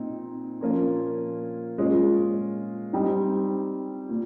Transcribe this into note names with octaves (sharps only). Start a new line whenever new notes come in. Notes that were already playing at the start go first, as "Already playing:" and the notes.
Already playing: A#2 C4 D#4
A#2 F3 A#3 C#4 F4
A#2 G#3 C#4 F4
G3 C4 D#4
A#2